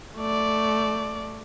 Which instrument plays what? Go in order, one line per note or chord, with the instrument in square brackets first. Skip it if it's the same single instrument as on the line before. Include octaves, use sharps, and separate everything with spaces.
[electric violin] A3 D5